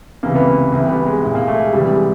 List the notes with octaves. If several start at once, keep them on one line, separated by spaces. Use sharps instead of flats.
C#2 C3 E3 A#3
B3
A#3
C2 C3 E3
B3
G#3
C2 A#2 G#3
A#3
A3
G#3
C2 C3 E3 G3
G#3